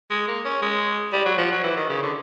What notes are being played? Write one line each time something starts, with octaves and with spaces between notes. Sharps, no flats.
G#3
A#3
C#4
G#3
G3
F#3
F3
F#3
E3
D#3
C#3
D3